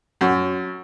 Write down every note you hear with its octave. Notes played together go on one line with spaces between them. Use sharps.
F#2